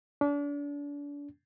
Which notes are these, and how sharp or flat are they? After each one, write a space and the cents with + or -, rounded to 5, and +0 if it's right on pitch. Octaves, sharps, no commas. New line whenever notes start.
D4 -35